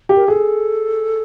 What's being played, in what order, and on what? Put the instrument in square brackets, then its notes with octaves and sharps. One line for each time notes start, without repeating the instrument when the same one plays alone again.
[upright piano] G4
[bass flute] A#4
[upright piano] G#4 [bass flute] A4